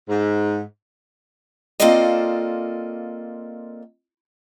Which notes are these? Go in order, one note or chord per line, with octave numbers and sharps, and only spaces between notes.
G#2
A#3 C4 F4 A4 D5 D#5